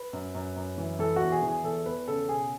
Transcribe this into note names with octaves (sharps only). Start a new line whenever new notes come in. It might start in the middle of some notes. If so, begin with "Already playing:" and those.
Already playing: B4
F#2
F#2
F#2
E3
E3 A4
F#4
E2
G#4
E3
G#4
E2 A4
E2 B4
C#3 A4
B2 G#4